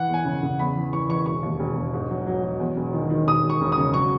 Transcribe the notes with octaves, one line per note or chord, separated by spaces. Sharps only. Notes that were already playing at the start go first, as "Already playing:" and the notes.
Already playing: E3 F#5
E2
G#5
C#3
C#3
E2 B5
E3
E3 C#6
E3 C#6
E1 C#6
D#2
E1
E1
G#2
F#3
F#3
F#3
E2
E1
D#3
D#3
E1 D#6
E1
C#6
E1
D#6
C#3
F#3 C#6